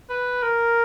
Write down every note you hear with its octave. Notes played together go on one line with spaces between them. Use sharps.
B4
A#4